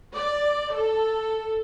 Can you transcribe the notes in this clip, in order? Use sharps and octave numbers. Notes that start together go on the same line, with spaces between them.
D5
A4